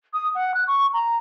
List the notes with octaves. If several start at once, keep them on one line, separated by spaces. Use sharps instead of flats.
D#6
F#5
F#6
C#6
A#5